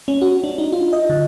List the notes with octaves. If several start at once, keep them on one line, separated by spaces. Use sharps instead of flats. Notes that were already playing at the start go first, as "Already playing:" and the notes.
C#4
F#4
D4
D#4
F4
D#5
D3